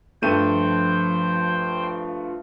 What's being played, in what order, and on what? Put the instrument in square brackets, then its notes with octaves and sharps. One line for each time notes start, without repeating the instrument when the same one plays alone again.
[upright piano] G2 A3 D#7 [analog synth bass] F3 [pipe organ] C5 G5